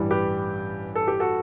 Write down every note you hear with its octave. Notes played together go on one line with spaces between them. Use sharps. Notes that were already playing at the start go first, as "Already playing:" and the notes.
Already playing: A1 G2 E3 G3
G4 B4
A4
G4
F#4 A4